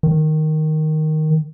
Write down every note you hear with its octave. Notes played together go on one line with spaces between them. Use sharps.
D#3